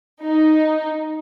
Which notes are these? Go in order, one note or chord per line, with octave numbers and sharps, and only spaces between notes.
D#4